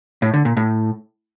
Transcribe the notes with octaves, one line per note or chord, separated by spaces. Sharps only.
A2
D3
A#2
A2